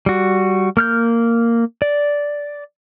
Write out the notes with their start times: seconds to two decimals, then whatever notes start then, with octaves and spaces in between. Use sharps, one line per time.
0.06 G3 F#4
0.77 A#3 F6 G6
1.82 D5